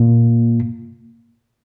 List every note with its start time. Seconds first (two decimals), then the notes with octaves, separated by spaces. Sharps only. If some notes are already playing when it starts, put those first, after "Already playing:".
Already playing: A#2